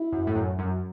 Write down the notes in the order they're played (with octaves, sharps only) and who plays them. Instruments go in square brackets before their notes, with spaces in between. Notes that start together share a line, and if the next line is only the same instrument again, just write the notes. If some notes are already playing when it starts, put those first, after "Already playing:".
Already playing: [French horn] E4
[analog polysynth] F#2
A2
F#2
F#2